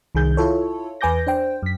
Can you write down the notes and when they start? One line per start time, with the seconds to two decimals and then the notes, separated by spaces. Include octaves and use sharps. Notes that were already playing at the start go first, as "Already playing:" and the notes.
0.15 C2 D#3 G#4 G6
0.37 E4 F4 A4 C#5
1.01 E2 B4 G#5 D6 G6 A#6
1.27 D4 C5 G5
1.63 F#2 B6